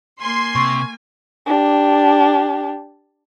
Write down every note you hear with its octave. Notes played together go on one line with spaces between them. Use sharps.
A#3 G#5 C6
C3 C#6
D4 G4